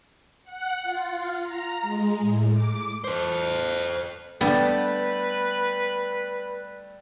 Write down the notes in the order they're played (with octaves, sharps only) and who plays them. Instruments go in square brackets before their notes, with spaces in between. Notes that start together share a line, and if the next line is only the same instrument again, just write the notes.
[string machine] F#5
F4
A#5
G#3
A2
D6
[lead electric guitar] A4 C5
[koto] D3 B3 [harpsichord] G3 A3 [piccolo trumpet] B4